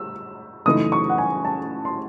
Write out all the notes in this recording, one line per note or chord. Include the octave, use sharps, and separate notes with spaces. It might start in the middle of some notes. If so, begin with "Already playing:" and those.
Already playing: E6
F#2 C#3 E3 A3 D#4 D#6
C#6
F#5
G#5
A5
C6